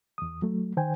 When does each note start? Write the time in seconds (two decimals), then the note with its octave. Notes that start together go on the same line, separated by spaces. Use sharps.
0.18 E2 D#6
0.42 F#3 A3
0.77 D#3 C5 G5 G#5